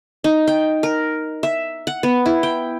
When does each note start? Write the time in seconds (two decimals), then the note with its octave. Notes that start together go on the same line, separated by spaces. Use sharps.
0.24 D#4
0.47 G5
0.83 A#4
1.43 E5
1.87 F#5
2.03 B3
2.26 E4
2.43 G5